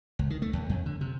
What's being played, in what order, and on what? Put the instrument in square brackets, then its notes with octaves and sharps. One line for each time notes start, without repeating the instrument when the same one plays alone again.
[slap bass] C#2
D#3
A3
D#2
F2
D3
C3